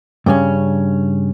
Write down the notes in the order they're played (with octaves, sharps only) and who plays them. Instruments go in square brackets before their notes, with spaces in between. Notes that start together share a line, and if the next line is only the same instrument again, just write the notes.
[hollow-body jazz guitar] G2 C#3 C#4